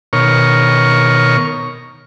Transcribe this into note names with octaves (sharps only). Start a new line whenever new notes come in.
B2 D#3 A#4 C#5 C#6 F6